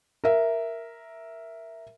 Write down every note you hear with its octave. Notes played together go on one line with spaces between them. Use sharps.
A#4 E5